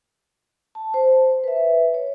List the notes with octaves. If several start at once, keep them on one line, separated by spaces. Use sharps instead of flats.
A5
C5
B4 E5
C#5